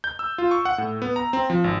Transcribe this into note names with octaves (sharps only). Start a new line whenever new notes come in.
G6
E6
F4
C#6
F#5
A2
B3
A#5
C4
F3
G#1